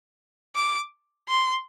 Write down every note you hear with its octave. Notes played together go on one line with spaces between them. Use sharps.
D6
C6